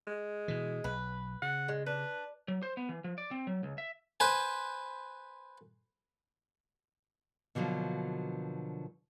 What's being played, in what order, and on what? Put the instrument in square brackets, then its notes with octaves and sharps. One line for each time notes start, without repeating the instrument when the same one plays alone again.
[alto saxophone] G#3
[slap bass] B2 E3
[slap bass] B1 [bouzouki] B4
[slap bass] C#3 [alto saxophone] F#5
[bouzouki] G#3
[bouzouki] D4 [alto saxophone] B4
[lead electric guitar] F#3
C5
B3
E3
F3
D5
C4
F#3
C#2
E5
[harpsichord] B4 C5 G#5
[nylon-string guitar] B2 D3 F3 F#3 A#3